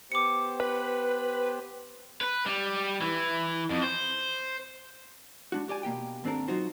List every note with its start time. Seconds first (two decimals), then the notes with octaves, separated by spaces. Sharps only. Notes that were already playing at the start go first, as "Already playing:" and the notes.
0.12 B3 G4 C5 D6 C#7
0.60 B4
2.21 B4
2.46 G3
3.02 E3
3.70 F2
3.83 C5
5.52 G#3 D4 F#4
5.68 F#4 G4 D5 G#5
5.83 B2 A#3 G4 G5
6.24 D#2 G#2 C4 D4 A4 A#4
6.48 F#3 D#4 F4 F#4 C5